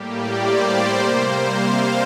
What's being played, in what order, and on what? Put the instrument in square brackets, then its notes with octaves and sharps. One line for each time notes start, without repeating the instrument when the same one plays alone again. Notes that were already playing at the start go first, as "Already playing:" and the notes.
Already playing: [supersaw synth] A2 G3 A#3 G4
D5
C5
C3 G3 A#3
F5